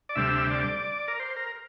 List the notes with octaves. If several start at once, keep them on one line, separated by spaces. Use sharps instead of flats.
D5
D2 C3 G3 E5
D5
A#4
C5
A#4